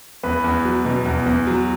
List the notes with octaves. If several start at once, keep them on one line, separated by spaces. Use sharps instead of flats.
E2 B4
E2
F#3
B2
E2
E2
F#3